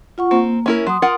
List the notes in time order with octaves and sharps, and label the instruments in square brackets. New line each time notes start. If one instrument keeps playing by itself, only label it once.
[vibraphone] F4 F#5 C#6
[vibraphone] A#3 [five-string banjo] C4
[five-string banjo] C#4 E4 A#4
[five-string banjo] F#3 [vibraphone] C6 D#6
[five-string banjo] F4 A#4 F#5